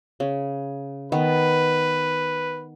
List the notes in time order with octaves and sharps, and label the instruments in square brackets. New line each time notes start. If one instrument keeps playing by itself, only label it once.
[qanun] C#3
[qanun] D#3 B3 [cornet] B4